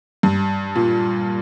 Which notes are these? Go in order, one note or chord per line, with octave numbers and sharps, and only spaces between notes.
G2
A#2